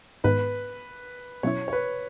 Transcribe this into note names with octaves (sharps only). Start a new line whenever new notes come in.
G#2 D#3 G#3 B3 D#4 B4
B2 F#3 C#4 E4 C#5
C#5
B4